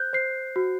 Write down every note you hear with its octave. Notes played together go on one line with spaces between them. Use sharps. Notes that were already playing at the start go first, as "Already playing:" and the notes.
Already playing: C5 F#6 G6
C5 C7
F#4